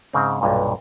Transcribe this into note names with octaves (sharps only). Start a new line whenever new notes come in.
G#2 C#3 C4
B1 G2 A#2